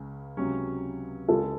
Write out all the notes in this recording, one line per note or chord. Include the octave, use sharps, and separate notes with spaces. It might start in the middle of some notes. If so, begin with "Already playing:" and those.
Already playing: C#2 C#3
C#2 C3 F#3 C#4
C#2 C#3 G#3 A4